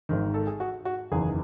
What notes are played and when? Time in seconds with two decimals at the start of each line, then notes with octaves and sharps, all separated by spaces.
0.09 G#1 G#2 D#3
0.34 A4
0.47 G#4
0.60 F#4
0.85 F#4
1.12 F#1 E2 D#3 G#4